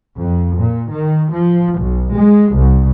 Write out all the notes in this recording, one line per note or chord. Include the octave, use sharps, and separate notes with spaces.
F2
A#2
D#3
F3
B1
G#3
C2